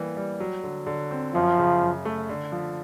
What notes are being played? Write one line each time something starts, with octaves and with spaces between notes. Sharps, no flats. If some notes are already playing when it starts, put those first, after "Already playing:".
Already playing: E3 G3 A#3
G3
F#3
D3
D3
C4
F#2 F3
C#3
F#2
A3
D3
F3